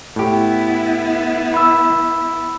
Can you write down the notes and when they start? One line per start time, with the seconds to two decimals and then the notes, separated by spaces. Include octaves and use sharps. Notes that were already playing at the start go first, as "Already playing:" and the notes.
0.16 A2 B3 E4 G4
1.54 B5 E6